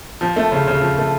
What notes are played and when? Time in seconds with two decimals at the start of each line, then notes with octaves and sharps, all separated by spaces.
0.21 F3
0.36 A3
0.52 C#3
0.67 C#3
0.82 F3
0.98 A3